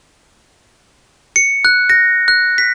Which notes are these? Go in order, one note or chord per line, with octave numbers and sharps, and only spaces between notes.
C#7
F#6
A#6
F#6
B6